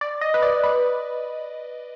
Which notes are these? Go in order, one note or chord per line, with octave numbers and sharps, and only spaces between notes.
D5
D#5
B4
D5
B4